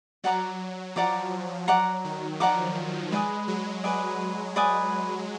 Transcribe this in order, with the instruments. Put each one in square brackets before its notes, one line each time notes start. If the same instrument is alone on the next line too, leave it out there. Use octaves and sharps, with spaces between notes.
[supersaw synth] F#3 [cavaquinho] D5 F#5 A#5 D6
[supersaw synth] F3 [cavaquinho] D5 F#5 A#5 D6
[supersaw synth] F#3 [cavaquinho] D5 F#5 A#5 D6
[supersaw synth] D#3
[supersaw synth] F3 [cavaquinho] D5 F#5 A#5 D6
[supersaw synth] G#3 [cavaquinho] B4 D5 G#5 D#6
[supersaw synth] F#3
[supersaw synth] F#3 [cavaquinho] B4 D5 G#5 D#6
[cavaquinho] B4 D5 G#5 D#6